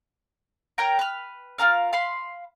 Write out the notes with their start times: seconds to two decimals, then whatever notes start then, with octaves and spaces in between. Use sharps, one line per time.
0.78 A#4 C#5 G5 A#5
0.99 B4 F6
1.58 F4 G#4 A#4 F5
1.93 F5 B5 C6